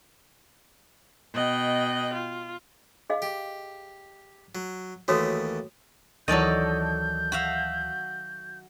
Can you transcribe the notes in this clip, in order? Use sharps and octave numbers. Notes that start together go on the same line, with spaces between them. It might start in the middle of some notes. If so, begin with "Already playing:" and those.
B2 D#5 G5 F#6
F4
G#4 D#5 F5
G4
F#3
D#2 E3 A3 F#4 C#5 D#6
D2 D#3 E3 F#3 A4 D5 D#5 G6
F#4 E5 F5